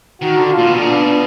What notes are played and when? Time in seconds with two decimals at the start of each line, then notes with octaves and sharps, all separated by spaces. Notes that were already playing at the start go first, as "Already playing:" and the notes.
0.21 D#3 F#4
0.37 D3
0.51 F4
0.58 A#2
0.67 B2
0.75 A#2
0.81 B2 D4